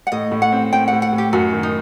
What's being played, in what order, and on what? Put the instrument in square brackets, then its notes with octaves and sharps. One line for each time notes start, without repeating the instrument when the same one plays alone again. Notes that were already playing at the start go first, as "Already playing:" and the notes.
[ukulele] F#5
[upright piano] A2 [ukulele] D#5
[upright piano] A2
[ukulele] F#5
[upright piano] C4
[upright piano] C4 [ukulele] G5
[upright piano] A2 [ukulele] F#5
[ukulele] F#5
[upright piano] A2
[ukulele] G4
[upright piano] F#2 [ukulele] F#4
[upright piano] D#3
[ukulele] D#4